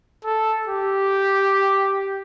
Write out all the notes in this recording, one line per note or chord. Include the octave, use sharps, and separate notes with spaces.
A4
G4